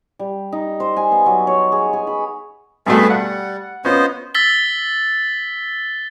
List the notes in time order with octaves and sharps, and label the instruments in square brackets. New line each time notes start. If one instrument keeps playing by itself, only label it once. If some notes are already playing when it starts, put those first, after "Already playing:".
[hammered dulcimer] G3
D#4
C5
G#5
B3
F#3
C#5
G#4
G#4
B5
[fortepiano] G2 B2 A3 [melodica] G#4 B4 E5
[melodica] G3 [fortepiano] F#5
[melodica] B3 C5 D#5 [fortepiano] C#4 F4
[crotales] E6 A6 B6 G7